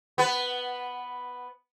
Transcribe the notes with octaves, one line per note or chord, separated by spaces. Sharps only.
B3 B4